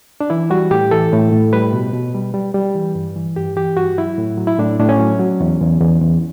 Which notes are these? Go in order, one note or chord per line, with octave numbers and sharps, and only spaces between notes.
D4
E3 E4
G3 F#4
A2 G4
E3 A4
A2
A2
G3 B4
B2
B2
G3
G3
G3
E3
G2
E3
G2 G4
E3 G4
G2 F#4
F#3 E4
A2
F#3
E4
A2 D4
A2 D4
C#4
F#3
F#3
E2
E2
E2
E2